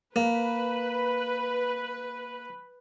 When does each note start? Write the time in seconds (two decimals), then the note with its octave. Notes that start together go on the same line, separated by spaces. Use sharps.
0.16 A#3 B4